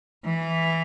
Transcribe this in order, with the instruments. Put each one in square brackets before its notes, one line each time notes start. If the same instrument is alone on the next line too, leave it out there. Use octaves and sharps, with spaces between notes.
[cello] E3